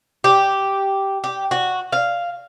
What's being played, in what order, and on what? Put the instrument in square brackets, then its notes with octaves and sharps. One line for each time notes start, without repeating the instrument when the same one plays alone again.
[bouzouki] G4
G4
F#4
F5